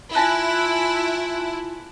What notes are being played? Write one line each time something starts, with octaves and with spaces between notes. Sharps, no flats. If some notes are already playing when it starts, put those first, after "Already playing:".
E4 F4 G#5 A5 F#6